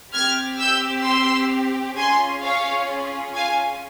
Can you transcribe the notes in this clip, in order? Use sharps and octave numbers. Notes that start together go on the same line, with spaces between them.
C4 G4 F6 G#6
E6 G6
C6 E6
C#4 F4 G#4 G#5 C6
C#5 F5
F5 G#5